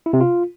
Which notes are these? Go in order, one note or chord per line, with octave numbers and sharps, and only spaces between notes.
E4
C3
F4